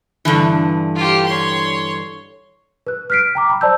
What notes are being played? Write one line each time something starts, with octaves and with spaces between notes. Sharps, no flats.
G2 D3 E3
F4 G4
C#5 C6
B4 F#6
F6 F#6 B6 C7 D7
G5 A#5 D6
A#5 B5
C5 D5 A5 E6 G6